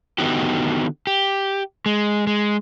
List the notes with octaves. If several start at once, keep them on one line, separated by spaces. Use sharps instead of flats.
D3 D#3 B3 D#4 F#4 G4
G4
G#3
G#3